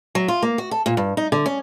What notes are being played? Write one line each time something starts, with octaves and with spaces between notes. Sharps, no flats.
F#3
F4
A#3
F#4
A4
A#2
G2
D#4
D3
C#4